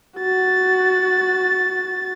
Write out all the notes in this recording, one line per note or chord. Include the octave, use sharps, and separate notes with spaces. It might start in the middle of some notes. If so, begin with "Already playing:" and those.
F#4 A6